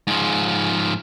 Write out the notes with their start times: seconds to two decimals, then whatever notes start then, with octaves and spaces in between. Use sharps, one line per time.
0.07 G#2 F3